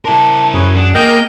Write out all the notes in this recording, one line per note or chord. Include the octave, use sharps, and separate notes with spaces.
D4 E4 A#4 C6
F#2 G#4 B4 C#5
D4 G#4 F#5
A#3 G#4 A#4 D#5 G5 G6